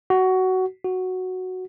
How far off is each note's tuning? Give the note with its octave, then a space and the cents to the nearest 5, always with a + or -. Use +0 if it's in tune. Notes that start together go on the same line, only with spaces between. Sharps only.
F#4 +15
F#4 +0